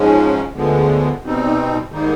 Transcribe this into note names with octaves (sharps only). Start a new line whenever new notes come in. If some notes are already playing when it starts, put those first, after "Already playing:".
Already playing: G#2 F3 G#3 C#4
D2 D3 F3 G#3 B3
B2 G3 C4 D#4
G#2 D#3 G3 A#3 D#4